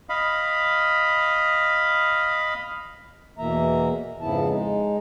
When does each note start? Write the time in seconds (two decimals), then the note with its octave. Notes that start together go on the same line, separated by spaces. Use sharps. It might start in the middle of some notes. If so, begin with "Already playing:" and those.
0.09 D#5 F5 B5
3.38 E2 B2 E3 A#3 E5 A#5
4.21 F2 G#2 C#3 B3 E4 A5
4.49 G#3 D#4